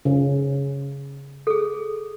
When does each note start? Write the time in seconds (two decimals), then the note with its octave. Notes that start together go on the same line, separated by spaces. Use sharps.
0.05 C#3
1.47 G#4 A4